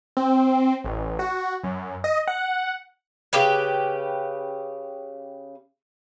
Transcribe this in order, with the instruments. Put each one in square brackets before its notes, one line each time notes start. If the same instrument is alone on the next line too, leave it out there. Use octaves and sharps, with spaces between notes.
[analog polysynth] C4
A1
F#4
F#2
D#5
F#5
[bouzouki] C#3 G4 B4